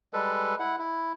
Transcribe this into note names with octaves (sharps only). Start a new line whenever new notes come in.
G3 G#3 A4 B4
E4 F#5
E4